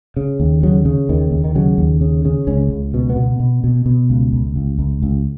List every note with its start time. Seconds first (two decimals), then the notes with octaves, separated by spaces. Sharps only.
0.17 C#3
0.40 D#2
0.63 C#3 F#3
0.85 C#3
1.09 D#2 D#3
1.31 D#2
1.44 D#3
1.55 C#3 F#3
1.78 D#2
2.01 C#3
2.25 C#3
2.47 C#2 C#4
2.70 C#2
2.94 B2
3.10 B3
3.16 B2
3.40 B2
3.64 B2
3.86 B2
4.10 C#2
4.32 C#2
4.56 C#2
4.79 C#2
5.02 C#2